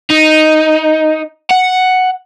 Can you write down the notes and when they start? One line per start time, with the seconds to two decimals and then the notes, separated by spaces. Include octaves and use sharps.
0.10 D#4
1.51 F#5